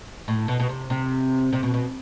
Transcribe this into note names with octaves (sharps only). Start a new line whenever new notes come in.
A2
B2
B2
C3
C3
C3
B2
B2